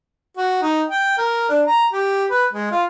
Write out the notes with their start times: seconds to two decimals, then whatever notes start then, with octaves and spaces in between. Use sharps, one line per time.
0.37 F#4
0.62 D#4
0.89 G5
1.18 A#4
1.49 D4
1.67 A#5
1.92 G4
2.30 B4
2.53 G#3
2.71 F4